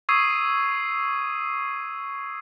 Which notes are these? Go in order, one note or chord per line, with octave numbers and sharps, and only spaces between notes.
C#6 D#6 E6 G#6 C7 D#7